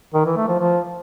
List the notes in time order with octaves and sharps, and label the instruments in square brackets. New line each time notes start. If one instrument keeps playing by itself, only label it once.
[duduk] D#3
E3
A3
F3
F3